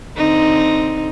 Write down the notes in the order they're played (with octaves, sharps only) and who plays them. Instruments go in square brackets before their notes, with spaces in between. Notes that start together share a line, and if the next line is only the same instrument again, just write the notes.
[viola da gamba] D3 C4 D#4